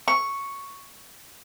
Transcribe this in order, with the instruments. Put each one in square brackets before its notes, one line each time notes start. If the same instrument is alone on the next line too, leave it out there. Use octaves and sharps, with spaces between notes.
[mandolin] C#6